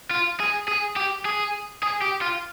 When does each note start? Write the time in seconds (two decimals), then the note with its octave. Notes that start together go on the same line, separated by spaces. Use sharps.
0.11 F4
0.40 G#4
0.68 G#4
0.96 G4
1.25 G#4
1.83 G#4
2.02 G4
2.22 F4